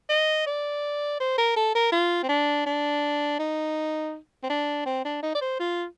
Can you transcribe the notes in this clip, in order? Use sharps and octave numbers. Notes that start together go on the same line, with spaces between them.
D#5
D5
C5
A#4
A4
A#4
F4
C4
D4
D4
D#4
C4
D4
C4
D4
D#4
D5
C5
F4